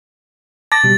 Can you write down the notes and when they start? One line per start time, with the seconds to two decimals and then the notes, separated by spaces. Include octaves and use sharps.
0.72 A5 D6 A6 A#6
0.84 B2 G3